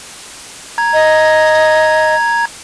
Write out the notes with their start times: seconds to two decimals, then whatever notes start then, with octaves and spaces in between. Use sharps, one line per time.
0.78 A#5 G#6
0.93 D#5